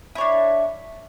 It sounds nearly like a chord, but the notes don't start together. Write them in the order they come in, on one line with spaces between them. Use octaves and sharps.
E4 C#5 D4